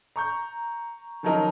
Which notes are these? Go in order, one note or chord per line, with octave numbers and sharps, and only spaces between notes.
A#5 C#6 G6
D#3 F3 F#3 C#4 D#4 A#4